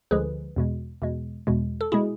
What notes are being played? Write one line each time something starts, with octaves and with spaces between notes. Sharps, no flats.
D2 D3 F3 G#3 G#4 B4
E2 B2 G#3
E2 B2 G#3
E2 B2 G#3
A4
B2 G#3 E4 G#4